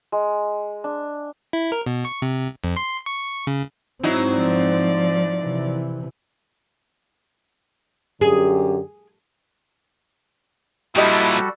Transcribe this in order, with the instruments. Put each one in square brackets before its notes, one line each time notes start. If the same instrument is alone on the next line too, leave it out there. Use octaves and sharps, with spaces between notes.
[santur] G#3
D4
[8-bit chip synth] E4
A#4
B2
C#6
C3
F2
C6
C#6
C#3
[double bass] G#2 C4 [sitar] F#3 D#4 E4
[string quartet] F3 D5
[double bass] C3 E3
[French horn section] F#2 D3 G4 [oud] G#4
[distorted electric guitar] A#2 F3 [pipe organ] G3 F#4 A4 [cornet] E4 [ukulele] G4 D#5